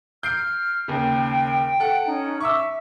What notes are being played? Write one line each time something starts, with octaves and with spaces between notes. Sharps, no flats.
F6 G6 C7 D7
D#2 C#3 G5
A4 F#5
C#4 D#4
E5 C#6 D6 E6